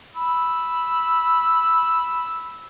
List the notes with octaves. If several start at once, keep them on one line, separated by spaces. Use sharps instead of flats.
B5 E6